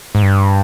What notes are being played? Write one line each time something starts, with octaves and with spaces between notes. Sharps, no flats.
G#2
G2